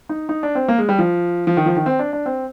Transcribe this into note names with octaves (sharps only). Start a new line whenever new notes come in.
D#4
D#4
D4
C4
A#3
G#3
G3
F3
F3
D#3
F3
D#3
C4
D4
D4
C4